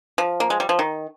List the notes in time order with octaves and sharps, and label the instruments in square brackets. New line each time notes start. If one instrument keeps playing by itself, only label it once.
[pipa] F3
A#3
G#3
G3
F3
D#3